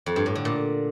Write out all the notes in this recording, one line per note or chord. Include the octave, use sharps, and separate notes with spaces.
F2
G2
A2
D3
A#2